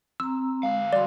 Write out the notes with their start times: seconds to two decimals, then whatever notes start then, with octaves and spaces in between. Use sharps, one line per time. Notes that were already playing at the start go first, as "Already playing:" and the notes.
0.20 C4 A#5 E6
0.63 D2 G#3 F5
0.93 G3 F#4 D5 C6